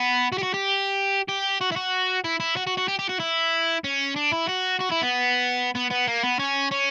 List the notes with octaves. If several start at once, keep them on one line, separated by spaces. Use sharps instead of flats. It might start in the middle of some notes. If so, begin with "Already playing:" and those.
Already playing: B3
F#4
G4
F#4
G4
G4
F#4
E4
F#4
E4
E4
F#4
F#4
F#4
G4
G4
F#4
E4
C#4
D4
E4
F#4
F#4
E4
B3
B3
B3
A#3
B3
C#4
C#4